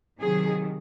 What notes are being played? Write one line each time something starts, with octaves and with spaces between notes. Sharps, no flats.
C3 D#3 F#3 G#4